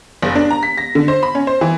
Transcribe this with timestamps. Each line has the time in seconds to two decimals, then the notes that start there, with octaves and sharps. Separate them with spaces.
0.22 F#1
0.35 D4
0.51 A#5
0.63 B6
0.78 A#6
0.95 D3
1.08 C5
1.23 B5
1.35 C#4
1.47 C5
1.61 E3